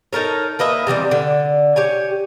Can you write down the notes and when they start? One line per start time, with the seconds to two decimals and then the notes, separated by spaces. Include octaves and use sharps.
0.13 D#4 A4 A#4 C#5
0.59 A#3 B4 D#5 E5
0.87 C3 E3 F#3 G3
1.11 D3
1.76 G4 C#5 G#5